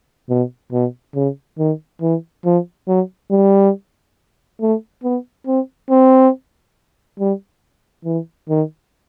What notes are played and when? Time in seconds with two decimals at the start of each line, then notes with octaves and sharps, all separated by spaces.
0.29 B2
0.72 B2
1.15 C#3
1.59 D#3
2.02 E3
2.45 F3
2.88 F#3
3.31 G3
4.61 A3
5.03 B3
5.47 C4
5.90 C4
7.19 G3
8.05 E3
8.49 D#3